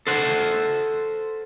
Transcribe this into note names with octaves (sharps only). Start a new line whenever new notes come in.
A4 C5 F#5